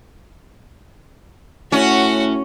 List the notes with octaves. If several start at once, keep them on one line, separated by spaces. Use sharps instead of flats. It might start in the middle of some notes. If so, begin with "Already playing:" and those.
A2 C#4 F#4 F#5